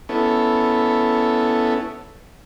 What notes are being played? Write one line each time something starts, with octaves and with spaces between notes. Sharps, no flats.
B3 C#4 E4 A4